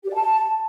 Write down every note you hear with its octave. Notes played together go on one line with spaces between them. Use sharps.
G4
D5
A5